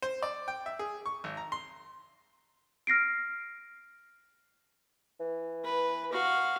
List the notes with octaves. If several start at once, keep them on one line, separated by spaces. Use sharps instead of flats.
C5
D5
G5
E5
G#4
C#6
G#1
A#5
C6
F6 A#6 C7 D7
E3
B4
F#4 F5